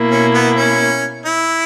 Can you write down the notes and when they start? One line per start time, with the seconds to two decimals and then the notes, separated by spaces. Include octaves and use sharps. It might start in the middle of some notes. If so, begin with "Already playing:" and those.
Already playing: B2 A#3 E4
0.11 C#4
0.34 B3
0.56 C#4
1.25 E4